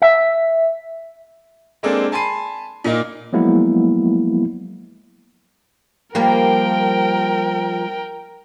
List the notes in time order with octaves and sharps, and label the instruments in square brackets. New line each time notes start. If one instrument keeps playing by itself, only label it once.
[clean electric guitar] E5
[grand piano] G#3 A#3 C4 D4 G#4 A4
G#5 A5 B5 C6 C7 D#7
A#2 A#3 D#4
[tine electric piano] F3 F#3 G#3 A#3 B3 E4
[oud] F3 G3 A#3 [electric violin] A#4 G5